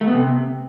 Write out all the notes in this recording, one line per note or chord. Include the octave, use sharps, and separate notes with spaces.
A3
B3
C3